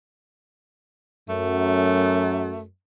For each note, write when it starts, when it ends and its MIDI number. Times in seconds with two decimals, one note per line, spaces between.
1.29 2.67 42
1.29 2.61 57